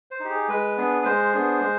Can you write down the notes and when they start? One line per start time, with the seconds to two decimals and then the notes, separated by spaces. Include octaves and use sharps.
0.11 C5
0.20 D#4 G4
0.30 G#4
0.49 G#3 B4
0.77 B3 D4 G#4
1.05 G#3 C5
1.32 B3 D4 G#4
1.61 G#3